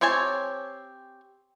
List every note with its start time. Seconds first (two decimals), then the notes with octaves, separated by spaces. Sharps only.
0.01 C4 G4 C#5 G#5 A5